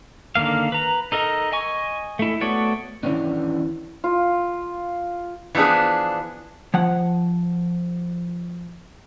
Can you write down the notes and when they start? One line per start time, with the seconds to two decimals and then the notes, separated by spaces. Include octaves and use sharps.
0.35 D3 D#3 A#3 F5
0.72 B4 A#5
1.12 D#4 A4 A#4 D#5
1.52 D#5 G#5 C#6
2.19 A3 E4
2.41 A3 B3 F#4 C#5 D5
3.03 D#3 E3 G3 B3 C#4 D4
4.04 F4
5.55 E3 F3 B3 D4 G#4
6.74 F3 F#5